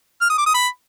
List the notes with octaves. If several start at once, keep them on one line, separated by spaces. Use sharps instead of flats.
F6
D#6
D6
D#6
B5